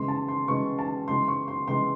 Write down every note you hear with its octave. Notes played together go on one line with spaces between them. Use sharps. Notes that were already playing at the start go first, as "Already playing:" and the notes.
Already playing: C#3 E3 G#3 C#4 C6
A5
C6
C#3 E3 G#3 C#4 C#6
A5
C#3 E3 G#3 C6
C#6
C6
C#3 E3 G#3 C6